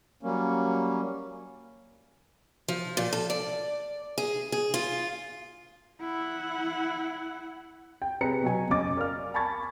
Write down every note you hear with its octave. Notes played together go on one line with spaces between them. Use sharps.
F#3 G3 A#3 C#4
F3
A#2
A4
D5
G#4
G#4
F4
E4 F#5
G5
C3 G#4 B4 A#5 C#7
B2 F#3 G#5
F#1 C#4 D#5 D6 A6
A#4 D5 F5 F6
G#5 A5 B5 C#6 G#6 A6